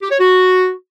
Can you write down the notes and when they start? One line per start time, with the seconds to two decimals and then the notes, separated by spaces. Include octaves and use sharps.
0.03 G4
0.11 C#5
0.19 F#4